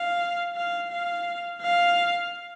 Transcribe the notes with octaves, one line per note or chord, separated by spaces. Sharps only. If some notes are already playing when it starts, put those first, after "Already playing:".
Already playing: F5
F5
F5
F5